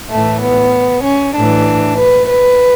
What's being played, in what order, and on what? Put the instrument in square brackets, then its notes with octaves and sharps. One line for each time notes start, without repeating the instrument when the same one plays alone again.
[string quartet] A2 E3 A3
B3
C#4
A2 E3 D4
B4
B4